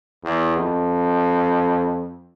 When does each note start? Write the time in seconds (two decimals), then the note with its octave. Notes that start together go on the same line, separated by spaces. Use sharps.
0.24 E2
0.57 F2